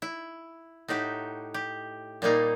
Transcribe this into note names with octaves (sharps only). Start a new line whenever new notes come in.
E4
A2 D#4 F#4 G4
G4
A#2 G3 A#3 D#4